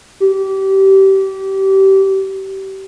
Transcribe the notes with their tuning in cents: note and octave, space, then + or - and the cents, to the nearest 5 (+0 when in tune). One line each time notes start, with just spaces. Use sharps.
G4 -25